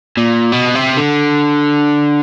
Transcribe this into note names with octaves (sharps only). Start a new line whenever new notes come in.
A#2
B2
C3
D3